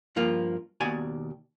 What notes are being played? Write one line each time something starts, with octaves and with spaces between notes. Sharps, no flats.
G2 F3 A#3 F4
D#2 B2 D5 G#5